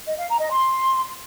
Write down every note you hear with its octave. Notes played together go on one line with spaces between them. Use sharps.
D#5
F5
A#5
D#5
C6